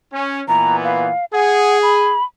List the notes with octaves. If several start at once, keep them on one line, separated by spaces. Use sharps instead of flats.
C#4
A#2 E3 B3 A#5
F5
G#4 F#5
B5